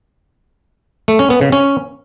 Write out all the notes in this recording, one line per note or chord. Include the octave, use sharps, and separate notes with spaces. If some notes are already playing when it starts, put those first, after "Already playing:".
A3
C#4
B3
C#3
C#4